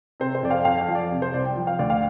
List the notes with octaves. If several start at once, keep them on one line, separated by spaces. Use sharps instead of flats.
C3 C5
C5
F2 D5
F5
F2 F5
F5
F3
D5
C3
C5
C2 D5
G5
F3
F5
D2 D5
F5